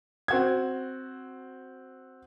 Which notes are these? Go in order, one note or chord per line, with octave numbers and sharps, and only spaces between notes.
C4 F#4 G#6